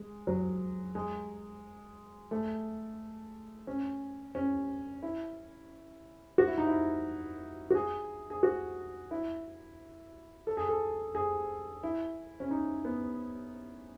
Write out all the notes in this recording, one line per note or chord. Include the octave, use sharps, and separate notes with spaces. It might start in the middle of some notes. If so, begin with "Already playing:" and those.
Already playing: G#3
F#3
G#3
A3
C#4
C#4
E4
F#4
E4
D#4
E4
F#4
G#4
G#4
F#4
E4
A4
G#4
A4
G#4
E4
C#4
D#4
B3